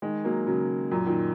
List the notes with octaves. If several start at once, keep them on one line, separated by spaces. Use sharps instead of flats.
D#3 G#3
F#3 A#3
C#3 F#3
F#2 A#2
A#2 D#3